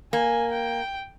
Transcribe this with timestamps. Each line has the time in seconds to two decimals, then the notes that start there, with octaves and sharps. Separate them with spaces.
0.13 A#3 G#5
0.52 G5